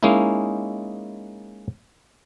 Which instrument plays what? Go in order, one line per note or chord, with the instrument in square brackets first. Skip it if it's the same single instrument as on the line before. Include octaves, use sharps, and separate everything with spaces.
[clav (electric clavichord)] G#3 A#3 C#4 D#4 E4